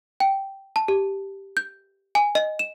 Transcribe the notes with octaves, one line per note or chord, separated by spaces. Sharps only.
G5
A5
G4
G6
G#5
D#5
E7